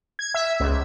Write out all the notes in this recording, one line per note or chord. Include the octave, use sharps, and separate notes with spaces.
G#6
E5
C#2